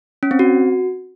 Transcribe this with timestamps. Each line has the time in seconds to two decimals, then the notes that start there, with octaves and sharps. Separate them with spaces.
0.23 C#4
0.31 C4
0.39 F#4